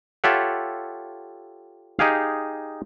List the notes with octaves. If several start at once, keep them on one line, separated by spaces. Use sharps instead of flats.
F4 G4 A4 C#5 E5 F#5
D#4 G4 G#4 F5